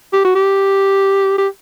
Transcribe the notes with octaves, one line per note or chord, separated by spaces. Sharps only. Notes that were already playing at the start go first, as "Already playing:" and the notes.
G4
F#4
G4
G4